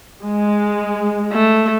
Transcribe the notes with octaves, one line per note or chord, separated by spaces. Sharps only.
G#3
A3